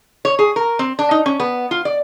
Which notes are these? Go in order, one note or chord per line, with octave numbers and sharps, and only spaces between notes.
C#5
G#4
A#4
C4
D4
D#4
C#4
B3
F4
D5